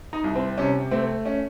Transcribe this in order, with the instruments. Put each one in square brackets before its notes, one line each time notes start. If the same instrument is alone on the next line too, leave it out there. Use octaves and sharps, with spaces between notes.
[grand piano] D#4
C2
C4
C3 C#4
A3 C4
C#4